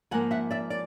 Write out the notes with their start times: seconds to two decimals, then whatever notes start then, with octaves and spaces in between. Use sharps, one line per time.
0.11 G#2 F3 A#3 F#5 G#5
0.31 E5 F#5
0.51 D5 E5
0.70 D5